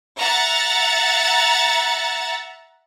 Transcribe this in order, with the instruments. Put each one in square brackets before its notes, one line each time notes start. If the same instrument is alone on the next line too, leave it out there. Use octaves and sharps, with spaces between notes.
[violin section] E5 F#5 A#5 A6